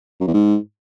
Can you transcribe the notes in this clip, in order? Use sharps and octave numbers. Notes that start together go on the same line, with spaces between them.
F#2
E2
G#2